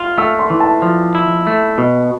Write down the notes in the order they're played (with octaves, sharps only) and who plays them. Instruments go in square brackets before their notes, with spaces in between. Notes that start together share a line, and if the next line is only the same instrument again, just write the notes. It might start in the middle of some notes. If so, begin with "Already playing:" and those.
Already playing: [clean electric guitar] F4 [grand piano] F6
[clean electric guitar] A3 [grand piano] E6
[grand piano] C6
[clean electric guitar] E3
[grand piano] A5
[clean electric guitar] F3
E4
A3
B2